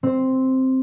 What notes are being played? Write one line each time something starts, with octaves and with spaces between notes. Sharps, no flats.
C4 C5